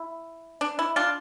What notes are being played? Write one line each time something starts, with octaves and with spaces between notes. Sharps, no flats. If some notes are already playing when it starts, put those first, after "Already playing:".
Already playing: E4
D4
E4
D4 F4